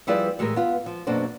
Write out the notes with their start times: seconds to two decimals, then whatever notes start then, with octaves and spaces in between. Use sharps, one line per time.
0.07 F3 G3 E4 G#4 B4 D5
0.39 A2 E3 G#3 G4 A#4
0.56 B3 F4
0.86 F3
1.07 F#2 B2 A#3 D4 A4 C5